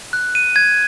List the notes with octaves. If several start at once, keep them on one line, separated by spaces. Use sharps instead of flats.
F#6
D#7
G#6